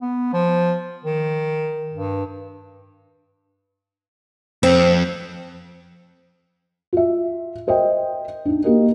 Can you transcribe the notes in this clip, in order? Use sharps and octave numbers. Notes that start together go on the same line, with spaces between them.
B3
F3
D#3
G2
F2 C4
F4 E5
A#4 C5 D#5 E5 G5
D4 D#4
A#3 G4 A#4 D#5